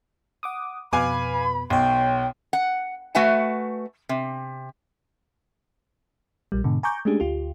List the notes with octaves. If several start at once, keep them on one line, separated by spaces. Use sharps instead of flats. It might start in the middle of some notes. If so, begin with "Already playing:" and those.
F#5 D6 D#6
F2 B2 B4 F5 G#5 B5 D6
B1 C#5 G5 C6
F#5
A3 F#4 B4 E5 F#5 G#5
C3
A#1 G3
G#2 B2 D3
G#5 A#5 C#6 D6 G6
G#3 A3 C#4 D4 G4 G#4
D2 F4 G4